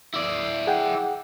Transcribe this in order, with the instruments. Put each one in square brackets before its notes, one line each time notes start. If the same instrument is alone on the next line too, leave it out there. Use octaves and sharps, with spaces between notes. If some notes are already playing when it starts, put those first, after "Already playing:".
[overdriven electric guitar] E4 D5
[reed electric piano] G#4 F#5 G5